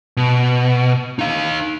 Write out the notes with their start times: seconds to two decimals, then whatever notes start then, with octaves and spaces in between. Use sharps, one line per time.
0.17 B2
1.19 D#4 F5